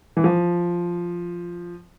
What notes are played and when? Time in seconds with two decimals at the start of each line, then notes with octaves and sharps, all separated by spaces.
0.17 E3
0.24 F3